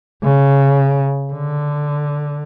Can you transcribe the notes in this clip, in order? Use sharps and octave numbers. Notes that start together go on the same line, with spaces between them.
C#3
D3